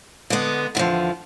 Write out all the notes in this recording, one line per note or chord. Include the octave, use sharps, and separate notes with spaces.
D3 G#3 B3
E2 D3 F3